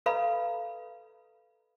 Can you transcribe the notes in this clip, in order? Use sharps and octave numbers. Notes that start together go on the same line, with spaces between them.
A4 B4 D#5 F5 A#5 B5